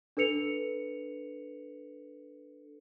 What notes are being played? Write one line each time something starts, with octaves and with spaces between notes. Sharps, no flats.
D4 A4 B4 C#7 F7